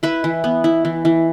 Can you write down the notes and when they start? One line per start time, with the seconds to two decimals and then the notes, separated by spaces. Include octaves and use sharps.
0.03 E4 B4 E5
0.24 E3
0.44 B3
0.64 E4
0.85 E3
1.05 E3